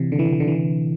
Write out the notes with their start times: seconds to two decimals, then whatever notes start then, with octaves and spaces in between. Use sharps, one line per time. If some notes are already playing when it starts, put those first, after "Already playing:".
Already playing: C3 E3
0.12 D3
0.19 E3
0.26 D3
0.33 E3
0.40 D3
0.48 E3
0.55 D3